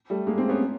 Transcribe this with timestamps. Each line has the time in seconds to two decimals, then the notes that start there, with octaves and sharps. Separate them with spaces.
0.10 G3 A3
0.27 G#3 A#3
0.38 A#3 C4
0.49 B3 C#4